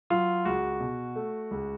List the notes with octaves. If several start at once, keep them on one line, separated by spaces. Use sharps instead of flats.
F#3 F4
C#2 F#4
B2
A3
C#2